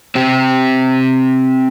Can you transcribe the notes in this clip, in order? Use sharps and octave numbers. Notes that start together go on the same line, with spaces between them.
C4 G4